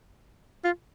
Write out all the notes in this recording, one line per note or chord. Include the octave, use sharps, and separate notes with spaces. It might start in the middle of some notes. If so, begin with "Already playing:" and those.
F4